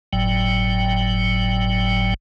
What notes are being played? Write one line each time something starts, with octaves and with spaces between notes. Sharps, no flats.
G1 A2 F#3 G5